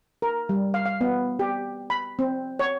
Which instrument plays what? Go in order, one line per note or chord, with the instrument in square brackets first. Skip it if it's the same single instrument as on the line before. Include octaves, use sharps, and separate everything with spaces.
[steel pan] A#4
G3
F5
F5
B3
G4
B5
C4
C#5